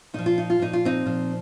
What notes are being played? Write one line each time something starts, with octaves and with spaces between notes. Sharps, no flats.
A#2 F3 D#4
F4
D#4
F4
A#2 F3 D#4
F4
C4 D#4
A#2 F3